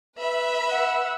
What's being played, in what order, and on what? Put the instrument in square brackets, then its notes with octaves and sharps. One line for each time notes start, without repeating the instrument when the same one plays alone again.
[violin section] B4 E5 B5
[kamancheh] F#5 E6